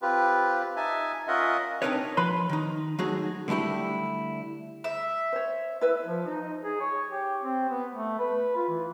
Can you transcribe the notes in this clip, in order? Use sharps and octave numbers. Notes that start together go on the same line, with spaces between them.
C4 F4 G4 B4
D#4 E5 G#5 A5
C#4 F4 A#4 D#5 E5 F#5
C4 D4 D#4 A#4 B4 C#5
F3 B4 B5 C6
D#3 D#4
F#3 A3 D#4 F#4 G#4
D3 G3 A3 E4 G4
E5
C5 C#5
E4 B4 E5
F3
D#4
G#4
C#5
G4
C4
B3
A3
B4
F4
E3